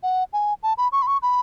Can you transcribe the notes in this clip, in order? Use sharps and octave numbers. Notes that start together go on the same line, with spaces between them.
F#5
G#5
A5
B5
C#6
B5
C#6
B5